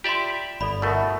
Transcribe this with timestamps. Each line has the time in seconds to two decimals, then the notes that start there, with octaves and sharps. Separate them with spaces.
0.04 F4 G4 D5 E5 C6
0.61 G1 A4 D5 B5
0.82 B2 A3 E4 A#4 E5